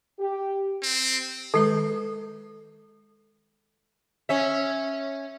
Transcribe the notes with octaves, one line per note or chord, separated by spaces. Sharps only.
G4
C4
D#3 G#3 A4 B4
C#4 E5